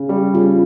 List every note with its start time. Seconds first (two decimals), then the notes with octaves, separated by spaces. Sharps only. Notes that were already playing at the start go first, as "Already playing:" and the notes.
Already playing: C#3
0.09 G3 G4
0.34 C#3 F4